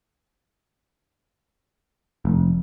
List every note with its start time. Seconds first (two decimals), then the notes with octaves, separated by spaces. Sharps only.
2.25 F1